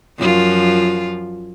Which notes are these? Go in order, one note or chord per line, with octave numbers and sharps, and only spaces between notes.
F#2 F3 F4